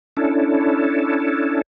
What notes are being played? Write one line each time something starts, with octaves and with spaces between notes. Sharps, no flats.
C#4 D4 E4 A4